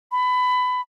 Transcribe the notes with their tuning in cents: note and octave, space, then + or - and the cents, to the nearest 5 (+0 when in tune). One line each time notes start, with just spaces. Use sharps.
B5 +20